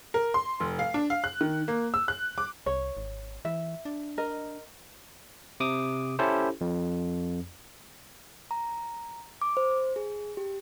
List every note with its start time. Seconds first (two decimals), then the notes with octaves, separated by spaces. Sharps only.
0.14 A#4
0.34 C6
0.60 F1
0.79 F5
0.94 D4
1.10 F5
1.24 F#6
1.41 D#3
1.68 A#3
1.94 E6
2.08 F#6
2.38 D6
2.66 C2 C#5
2.97 G#1
3.45 E3 E5
3.85 D4
4.18 A#4 D#5
5.60 C3 D6 D#6
6.19 C#4 E4 G4 A4 C5
6.61 F2
8.51 A#5
9.42 D6
9.57 C5
9.96 G#4
10.37 G4